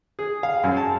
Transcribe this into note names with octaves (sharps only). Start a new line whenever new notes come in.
G#4
F5
F#2
A5